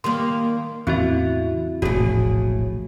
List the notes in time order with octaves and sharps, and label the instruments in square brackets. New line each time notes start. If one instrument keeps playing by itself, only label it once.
[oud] D#3 G3 A#3 [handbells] C6
[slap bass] E2 A2 C#3 [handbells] C4 F#4 E5 [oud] E4
[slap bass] E1 A#1 C3 [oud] A2 G#4 [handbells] F#4